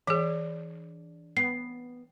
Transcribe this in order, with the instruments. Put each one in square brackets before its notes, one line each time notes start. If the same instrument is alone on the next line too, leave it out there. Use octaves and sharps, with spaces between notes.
[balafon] E3 G#4 [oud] D4
[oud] B3 [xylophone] C7